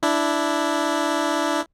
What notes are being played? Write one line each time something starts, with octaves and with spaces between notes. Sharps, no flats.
D4 E4